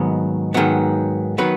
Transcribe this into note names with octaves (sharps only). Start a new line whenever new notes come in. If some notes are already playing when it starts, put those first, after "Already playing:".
Already playing: G#2 D#3 F#3 B3
G#2 D#3 F#3 B3
D#3 F#3 B3 B4